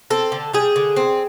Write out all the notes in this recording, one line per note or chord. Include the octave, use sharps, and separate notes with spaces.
C4 A4
D3
G3 G#4
D3
C4